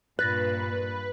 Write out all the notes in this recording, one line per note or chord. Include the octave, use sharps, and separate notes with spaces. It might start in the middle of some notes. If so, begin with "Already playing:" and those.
G2 A#2 B4 F#6 A6 A#6